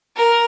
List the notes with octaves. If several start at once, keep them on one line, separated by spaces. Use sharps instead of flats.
A#4